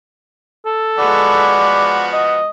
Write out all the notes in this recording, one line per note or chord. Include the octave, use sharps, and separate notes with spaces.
A4
F3 G#3 B3 F#4 D5 B5
D#5